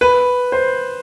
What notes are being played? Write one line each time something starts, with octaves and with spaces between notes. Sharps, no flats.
B4
C5